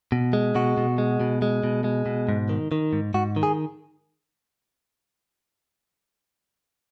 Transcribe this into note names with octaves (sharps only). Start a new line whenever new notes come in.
B2
G#3
B2 F#4
B2
G#3
B2
G#3
B2
G#3
B2
G#2
D#3
D#3
G#2
G#2 F#4
D#3
G#4